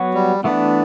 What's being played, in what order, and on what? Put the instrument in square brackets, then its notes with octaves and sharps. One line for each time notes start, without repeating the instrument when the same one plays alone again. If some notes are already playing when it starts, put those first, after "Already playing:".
Already playing: [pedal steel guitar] F#3 B3 F#4 C#5
[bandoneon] G3
[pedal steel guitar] E3 A3 D4 [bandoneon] B3